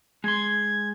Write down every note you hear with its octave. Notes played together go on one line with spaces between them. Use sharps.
G#3 C6 G#6